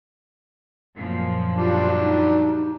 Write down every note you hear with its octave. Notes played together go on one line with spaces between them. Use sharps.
F#2 A#2 F3
F#3 G3 D4 F4
D#4